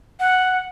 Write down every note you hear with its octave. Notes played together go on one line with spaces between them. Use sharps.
F#5